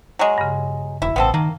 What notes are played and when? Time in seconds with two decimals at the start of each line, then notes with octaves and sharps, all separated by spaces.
0.19 F#3 G#3
0.38 G2 C#3
1.02 E1 E4
1.16 A1 B3 C4 A4
1.34 D#3 A#3